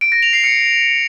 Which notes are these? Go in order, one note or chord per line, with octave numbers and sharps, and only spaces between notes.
D7
A#6
F7
C7
C#7